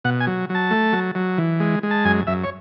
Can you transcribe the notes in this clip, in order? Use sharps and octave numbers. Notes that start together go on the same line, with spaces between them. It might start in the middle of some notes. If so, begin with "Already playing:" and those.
B2 F#5
G#5
F#3
F#3
A5
A3
F#3
F#3
E3
G#3
G#3
A5
F#2 G#5
F#2 E5
C#5